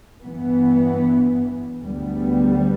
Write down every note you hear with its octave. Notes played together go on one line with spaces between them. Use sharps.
G2 E3 B3
D2 D3 G3 B3